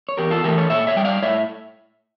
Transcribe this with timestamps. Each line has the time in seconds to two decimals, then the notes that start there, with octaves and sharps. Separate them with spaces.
0.09 C#5
0.17 E2 G4 A#4
0.31 F4 A4
0.44 E3 A3 G4 A#4
0.58 A4 C#5
0.70 A#2 C#5 E5
0.87 C#5 E5
0.96 G3 G5
1.05 D5 F5
1.22 A2 C#5 E5